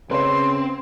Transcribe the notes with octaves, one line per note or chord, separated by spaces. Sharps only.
C#3 C4 B4 C#5 C6